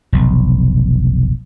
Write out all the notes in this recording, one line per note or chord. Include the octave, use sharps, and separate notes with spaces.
F1 B1